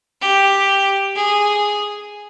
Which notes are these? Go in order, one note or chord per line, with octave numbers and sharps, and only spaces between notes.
G4
G#4